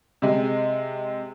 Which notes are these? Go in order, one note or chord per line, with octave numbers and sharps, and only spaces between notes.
C3 G#3